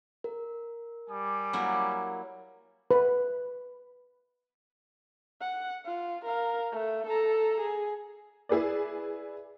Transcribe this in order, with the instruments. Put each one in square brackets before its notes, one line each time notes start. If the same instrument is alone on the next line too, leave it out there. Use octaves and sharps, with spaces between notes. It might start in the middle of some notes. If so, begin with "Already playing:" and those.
[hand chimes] A#4
[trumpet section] G3 G#5 D6
[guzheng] F#3 A#3 E4
[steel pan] B4
[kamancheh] F#5
F4
A#4 F5
A3
A4 A#5
G#4
[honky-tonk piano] E4 G#4 B4 D5